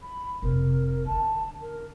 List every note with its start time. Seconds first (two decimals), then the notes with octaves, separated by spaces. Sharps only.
0.01 B5
0.42 F1 C3 A#4
1.06 D3 A5
1.60 A#4